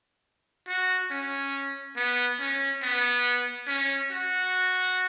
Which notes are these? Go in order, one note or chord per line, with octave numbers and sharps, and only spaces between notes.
F#4
C#4
B3
C#4
B3
C#4
F#4